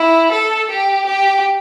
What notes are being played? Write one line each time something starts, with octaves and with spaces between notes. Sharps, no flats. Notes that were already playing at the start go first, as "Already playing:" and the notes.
Already playing: E4
A4
G4
G4